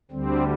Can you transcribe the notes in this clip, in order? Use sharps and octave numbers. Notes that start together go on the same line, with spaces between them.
D2 D3 G3 C4